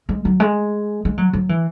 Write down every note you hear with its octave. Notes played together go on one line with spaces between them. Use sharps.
G#3
F#3
G#3
G#3
F#3
F#3
E3